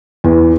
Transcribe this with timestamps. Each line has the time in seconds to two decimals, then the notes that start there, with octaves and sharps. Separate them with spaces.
0.24 E2